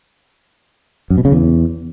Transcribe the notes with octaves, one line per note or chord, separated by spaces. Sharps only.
F#2
B2
C#3
E2